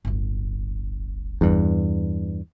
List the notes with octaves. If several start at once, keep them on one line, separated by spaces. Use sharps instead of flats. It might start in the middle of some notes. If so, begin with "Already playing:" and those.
D1 G1
E2 G2